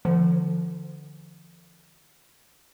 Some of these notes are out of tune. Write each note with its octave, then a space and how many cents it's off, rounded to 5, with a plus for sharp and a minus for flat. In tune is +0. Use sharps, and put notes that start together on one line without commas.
D3 +20 F3 -25